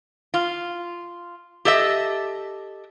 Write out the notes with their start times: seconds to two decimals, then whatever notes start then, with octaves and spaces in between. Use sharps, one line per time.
0.34 F4
1.65 G4 A4 D#5 E5